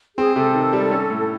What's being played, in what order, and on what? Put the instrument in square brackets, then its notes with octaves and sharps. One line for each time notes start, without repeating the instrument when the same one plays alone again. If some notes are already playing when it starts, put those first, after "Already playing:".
[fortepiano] C4 [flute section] G#4
[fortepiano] C3 [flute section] A4
[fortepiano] D#3
G3
C#4
A2